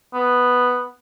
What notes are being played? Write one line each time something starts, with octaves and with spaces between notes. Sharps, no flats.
B3